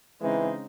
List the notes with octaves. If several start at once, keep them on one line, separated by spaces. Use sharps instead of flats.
C#3 E3 G#3 C4 D#4